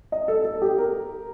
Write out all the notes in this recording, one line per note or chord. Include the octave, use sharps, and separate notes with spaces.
D#5
A4
A4
G4
A#4